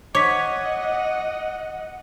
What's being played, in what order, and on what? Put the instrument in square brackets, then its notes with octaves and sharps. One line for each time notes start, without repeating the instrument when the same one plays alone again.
[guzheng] C#5 [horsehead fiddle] D#5 F#5 [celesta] D6 B6